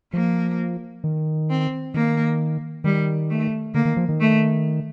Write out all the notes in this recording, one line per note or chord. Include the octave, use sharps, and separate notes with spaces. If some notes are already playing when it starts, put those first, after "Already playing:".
F3 A#3
D#3
C4
D#3 A#3
D#3 G3
A3
D3 A#3
D#3
F3
D#3
A3